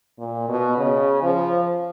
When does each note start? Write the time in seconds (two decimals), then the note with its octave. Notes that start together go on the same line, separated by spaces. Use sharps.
0.19 A#2
0.49 B2
0.78 C#3
1.23 F3